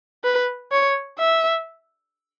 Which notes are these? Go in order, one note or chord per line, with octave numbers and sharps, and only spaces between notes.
B4
C#5
E5